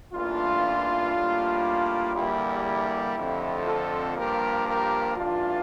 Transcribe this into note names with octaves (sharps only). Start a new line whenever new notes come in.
A1 G2 E3 A#3 D4 F4
A2 G3 A#3
E2 D3 G3 A#3 E4 G4
F2 D3 F3 A3 C4
F4 A4
G2 F3 A#3 G4 A#4
G4 A#4
A1 G2 E3 D4 F4